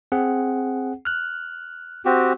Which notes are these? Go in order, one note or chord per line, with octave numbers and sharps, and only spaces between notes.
C4 G#4 F#5
F6 F#6
C4 F#4 G4